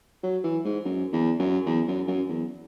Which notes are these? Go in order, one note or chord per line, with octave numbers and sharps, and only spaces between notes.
F#3
E3
G#2
F#2
E2
F#2
E2
F#2
F#2
E2